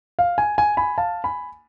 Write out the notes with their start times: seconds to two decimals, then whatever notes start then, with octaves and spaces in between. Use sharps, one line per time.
0.19 F5
0.38 G#5
0.58 G#5
0.77 G#5 B5
0.98 F5 A5
1.24 G#5 B5